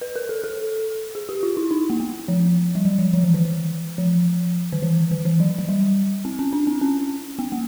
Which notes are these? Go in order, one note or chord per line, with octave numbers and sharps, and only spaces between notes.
B4
A#4
A4
A4
G#4
G4
F4
E4
D#4
A#3
B3
F3
G3
F#3
F3
F3
E3
D#3
E3
F3
D#3
E3
D#3
E3
F#3
F#3
G3
C4
C#4
D4
C4
C#4
B3
A#3